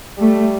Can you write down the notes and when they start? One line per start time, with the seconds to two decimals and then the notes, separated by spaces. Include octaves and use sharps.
0.19 G3 A3